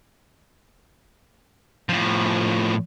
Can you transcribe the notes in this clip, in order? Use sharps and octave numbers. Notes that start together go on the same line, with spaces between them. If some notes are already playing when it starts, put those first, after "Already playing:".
A2 F3